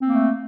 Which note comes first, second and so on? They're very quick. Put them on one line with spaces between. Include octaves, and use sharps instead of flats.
C4 A#3 A3